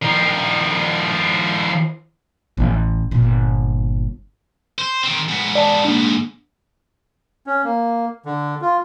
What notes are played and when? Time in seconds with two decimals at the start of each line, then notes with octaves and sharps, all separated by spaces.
0.02 D#3 F3
2.57 A1
3.11 G1 A#2
4.78 C5
5.03 D#3 C4
5.29 G#2 B3
5.55 D5 A5
5.85 A#3 D4
7.47 C#4
7.64 A#3
8.25 D3
8.61 F4